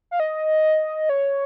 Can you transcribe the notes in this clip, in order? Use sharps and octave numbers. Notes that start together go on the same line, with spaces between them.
F5
D#5
C#5